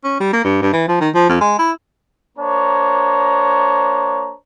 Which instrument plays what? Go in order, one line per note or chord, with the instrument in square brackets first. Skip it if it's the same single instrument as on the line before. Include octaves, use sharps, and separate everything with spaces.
[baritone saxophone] C#4
G3
A#3
G2
G2
E3
F3
D#3
F3
F2
G#3
E4
[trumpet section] A#3 D4 C5 C#5 A#5